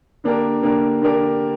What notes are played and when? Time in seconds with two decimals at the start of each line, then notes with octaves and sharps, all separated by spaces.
0.24 D3 A#3 D4 G4 A#4
0.62 D3 A#3 D4 G4 A#4
1.01 D3 A#3 D4 G4 A#4